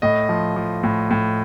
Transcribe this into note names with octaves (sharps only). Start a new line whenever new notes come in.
A2 D#5
F3
F3
A2
A2